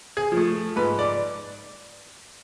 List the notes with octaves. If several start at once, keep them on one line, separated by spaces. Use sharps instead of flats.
G#4
F3 A3
G#2 B4
D5